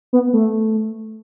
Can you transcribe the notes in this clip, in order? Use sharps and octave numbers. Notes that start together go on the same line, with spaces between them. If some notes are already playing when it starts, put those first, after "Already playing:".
B3
A3